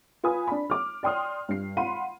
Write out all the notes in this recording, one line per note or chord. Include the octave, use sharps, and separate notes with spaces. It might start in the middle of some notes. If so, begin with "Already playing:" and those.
F4 B4 G#5 B5 D#6
D4 B5
D6 F6
D5 G5 C6 D#6 F6
G2 C7
F5 F#5 B5 C6 D#7